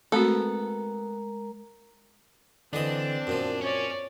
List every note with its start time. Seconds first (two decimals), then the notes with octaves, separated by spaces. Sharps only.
0.12 G#3 A3 B3 C4 F#4 A4 A#4 A#5
2.73 D3 E3 C4 D4 D#5
3.27 F#2 A#2 F3
3.61 C#4 C#5 D5